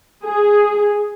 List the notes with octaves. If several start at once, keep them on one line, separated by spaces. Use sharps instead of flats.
G#4